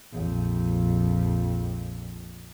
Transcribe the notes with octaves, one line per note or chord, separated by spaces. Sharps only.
A#1 F2